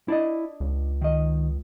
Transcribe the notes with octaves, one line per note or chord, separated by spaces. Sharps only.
D4 E4 D5 D#5
C#2
D#3 D#5